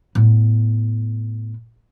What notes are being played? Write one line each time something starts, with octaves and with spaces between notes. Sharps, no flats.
A2 B3